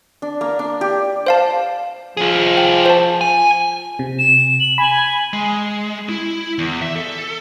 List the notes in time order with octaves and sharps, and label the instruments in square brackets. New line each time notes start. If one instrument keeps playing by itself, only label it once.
[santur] D4
A#3
D4
G4
[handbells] C5 F5 A5
[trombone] F3 [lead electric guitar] F4 G#4
[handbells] G5
C5 A5
[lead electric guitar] G#5
[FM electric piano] C3
[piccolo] E7
F#7
[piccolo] G#5 [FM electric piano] B5
[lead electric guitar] G#3
E4
E2
E5
A4